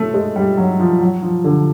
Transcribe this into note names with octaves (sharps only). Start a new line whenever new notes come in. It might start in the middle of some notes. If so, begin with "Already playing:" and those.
Already playing: A3
G#3
G3
F#3
F3
F#3
F3
D3